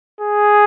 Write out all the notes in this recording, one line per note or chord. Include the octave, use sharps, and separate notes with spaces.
G#4